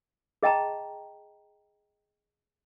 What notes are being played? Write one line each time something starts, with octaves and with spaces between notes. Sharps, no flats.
G#4 D#5 G5 A5 A#5